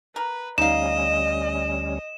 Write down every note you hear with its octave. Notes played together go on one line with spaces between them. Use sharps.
A#4 B4
D2 G3 C#4 D#4 D#5 F5 E7